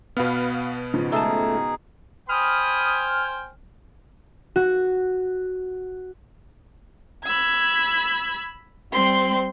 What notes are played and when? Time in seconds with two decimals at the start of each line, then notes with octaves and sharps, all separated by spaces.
0.17 B2 B3 B4 F5 F6
0.94 G#2 C#3 F3
1.12 A3 D#4 G#4 A5
2.29 C5 G5 G#5 B5 D#6 F6
4.56 F#4
7.24 B5 E6 G#6
8.92 G3 C4 C6